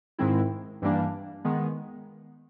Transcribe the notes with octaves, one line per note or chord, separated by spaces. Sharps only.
G#2 D#3 G#3 C4 E4
G2 E3 G3 A#3 D4
D#3 G#3 B3